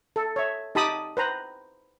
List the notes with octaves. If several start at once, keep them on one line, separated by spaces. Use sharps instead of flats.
A4
C#5 E5
D#4 G4 A5 B5 D#6
B4 C5 A#5